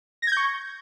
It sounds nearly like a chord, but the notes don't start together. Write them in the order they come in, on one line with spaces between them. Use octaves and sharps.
A#6 G#6 G6 C#6